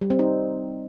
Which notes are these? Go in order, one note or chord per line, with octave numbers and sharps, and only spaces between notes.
G3
C4
D#4